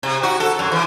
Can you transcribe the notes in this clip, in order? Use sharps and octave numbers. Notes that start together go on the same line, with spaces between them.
C3
F#4
A4
F#2
E3